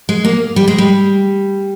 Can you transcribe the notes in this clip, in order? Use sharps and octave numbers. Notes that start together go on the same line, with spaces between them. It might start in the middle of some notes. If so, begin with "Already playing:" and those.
G#3
A#3
G3
G#3
G3